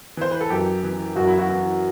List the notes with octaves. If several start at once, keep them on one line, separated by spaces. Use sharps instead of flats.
E3 C5
B4
A4
F#2 G4
E3
F#2 F#4
E4
F#4
E3